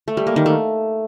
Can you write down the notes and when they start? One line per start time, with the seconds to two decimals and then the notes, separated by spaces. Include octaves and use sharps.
0.08 A3
0.17 G3
0.27 A#3
0.36 D#3
0.46 A3